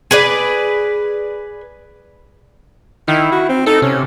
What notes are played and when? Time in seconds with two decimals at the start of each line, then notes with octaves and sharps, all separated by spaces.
0.11 G#4 B4 D5
3.08 D#3 E4
3.32 F#4
3.49 C4
3.66 D#4 A4
3.82 C3 C#4